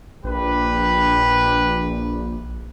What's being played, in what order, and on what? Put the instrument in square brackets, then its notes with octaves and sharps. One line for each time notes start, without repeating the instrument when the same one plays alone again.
[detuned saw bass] A#1 [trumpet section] G4 B4